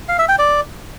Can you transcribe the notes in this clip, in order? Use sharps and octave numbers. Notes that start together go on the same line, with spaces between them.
F5
E5
G5
D5